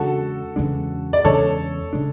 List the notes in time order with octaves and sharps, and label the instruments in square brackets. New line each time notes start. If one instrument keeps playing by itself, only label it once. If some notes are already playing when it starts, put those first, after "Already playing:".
Already playing: [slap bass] E2 C#3 G#3 D4 [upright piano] F#4 A4
[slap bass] E2 C#3 G#3 D4
[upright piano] D5
[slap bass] E2 C#3 G#3 D4 [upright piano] A4 C#5
[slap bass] C#3 G#3 D4